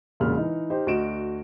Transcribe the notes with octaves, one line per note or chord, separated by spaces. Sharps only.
E1 A#2 C#3 G#3 F6
E3 D#4
D#4 G4 C5
D2 F#4 D#5 D7 E7